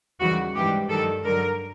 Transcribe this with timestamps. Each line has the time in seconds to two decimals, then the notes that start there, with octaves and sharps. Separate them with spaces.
0.20 D#2 C#3 E3 G3 F#4
0.54 G#2 E3 G3 G4
0.89 G2 D#3 F#3 A4
1.24 G2 D3 F#3 A#4